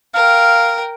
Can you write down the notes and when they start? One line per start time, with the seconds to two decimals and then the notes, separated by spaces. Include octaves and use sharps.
0.14 A#4 F5 G5